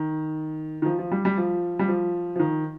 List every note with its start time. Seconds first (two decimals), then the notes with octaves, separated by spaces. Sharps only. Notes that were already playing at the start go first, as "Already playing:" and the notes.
Already playing: D#3
0.82 D#3
0.85 F3
0.99 F3
1.11 G3
1.25 G3
1.38 F3
1.79 G3
1.88 F3
2.36 F3
2.39 D#3